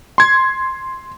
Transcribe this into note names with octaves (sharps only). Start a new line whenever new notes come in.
C6 G#6